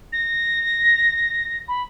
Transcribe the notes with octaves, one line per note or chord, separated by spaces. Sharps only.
A#6
B5